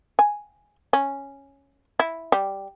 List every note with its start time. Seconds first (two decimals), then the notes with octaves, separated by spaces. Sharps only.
0.19 G#5
0.93 C#4
2.00 E4
2.32 G3